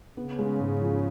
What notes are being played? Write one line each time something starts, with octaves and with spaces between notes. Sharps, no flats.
C#3 B3
G#3
G#2
F3